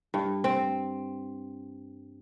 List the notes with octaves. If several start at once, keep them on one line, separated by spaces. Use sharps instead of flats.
G2
C4